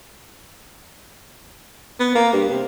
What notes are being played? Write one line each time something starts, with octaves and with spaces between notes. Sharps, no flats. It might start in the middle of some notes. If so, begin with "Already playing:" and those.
B3
A#3
G2
C3